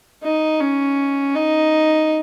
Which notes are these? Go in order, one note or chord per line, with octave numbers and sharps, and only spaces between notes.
D#4
C#4
D#4